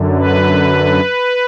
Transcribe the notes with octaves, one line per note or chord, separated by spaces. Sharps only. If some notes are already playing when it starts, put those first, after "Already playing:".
Already playing: F#2 D3
B4